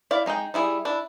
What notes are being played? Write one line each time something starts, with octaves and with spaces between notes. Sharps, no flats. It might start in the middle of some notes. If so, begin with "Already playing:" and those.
E4 D5 F5
G#3 D#4 G#4 G5
G3 E4 G#4
D4 E4